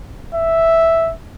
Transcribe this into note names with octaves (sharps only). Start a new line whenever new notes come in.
E5